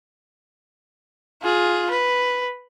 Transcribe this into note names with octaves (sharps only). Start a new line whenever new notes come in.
F4 G#4
B4